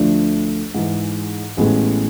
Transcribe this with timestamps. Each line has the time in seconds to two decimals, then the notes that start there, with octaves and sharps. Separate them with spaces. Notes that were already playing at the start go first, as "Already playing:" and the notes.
Already playing: D2 D3 F3 A3 D4
0.74 G#2 E3 G#3
1.57 A1 A2 G#3 B3